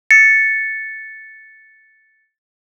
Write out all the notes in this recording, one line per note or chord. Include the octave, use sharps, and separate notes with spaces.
A6 C#7